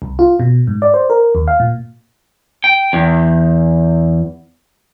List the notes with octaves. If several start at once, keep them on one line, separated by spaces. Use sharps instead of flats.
C2
F4
B2
G#2
D5
C5
A#4
D#2
F5
A#2
G5
E2